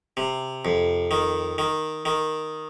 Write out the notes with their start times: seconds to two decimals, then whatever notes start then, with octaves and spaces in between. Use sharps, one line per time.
0.17 C3
0.65 F2
1.11 D#3
1.58 D#3
2.05 D#3